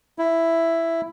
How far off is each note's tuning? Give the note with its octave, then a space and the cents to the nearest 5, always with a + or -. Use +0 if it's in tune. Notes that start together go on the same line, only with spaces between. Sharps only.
E4 +5